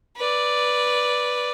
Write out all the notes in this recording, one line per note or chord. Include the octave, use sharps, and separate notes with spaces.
B4 D5